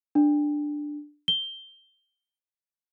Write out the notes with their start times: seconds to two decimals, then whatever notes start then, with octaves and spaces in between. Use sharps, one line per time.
0.15 D4
1.28 G7